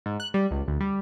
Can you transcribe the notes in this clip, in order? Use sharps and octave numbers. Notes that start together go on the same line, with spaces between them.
G#2
F#6
G3
C#2
D2
G3